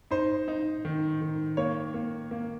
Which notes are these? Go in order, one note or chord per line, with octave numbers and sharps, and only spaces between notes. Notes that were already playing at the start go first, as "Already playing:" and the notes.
D#4 C5
D#4
D#3
D#3
A#3 C#5
A#3
A#3